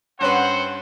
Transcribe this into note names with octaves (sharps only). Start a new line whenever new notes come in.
G2 C4 C#4 B4 C5 F#5